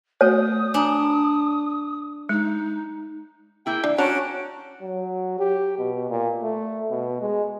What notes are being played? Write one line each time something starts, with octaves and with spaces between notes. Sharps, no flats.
A3 F#4 C#5 D#6
D4 G#5 A#5
G#3 D#4
A#3 E4 G#4 G5
E3 D4
C#4 D4 F#4 C5 C#5 F#5 A#5 D7
F#3
G4
B2
A#2
A3
B2
G#3